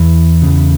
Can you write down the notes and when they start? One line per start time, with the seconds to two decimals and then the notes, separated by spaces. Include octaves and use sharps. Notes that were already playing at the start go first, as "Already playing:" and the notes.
Already playing: E2 E3
0.42 E2 C#3